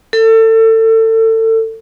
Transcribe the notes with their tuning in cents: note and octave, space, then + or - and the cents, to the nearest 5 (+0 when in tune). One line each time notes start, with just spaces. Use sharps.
A4 +30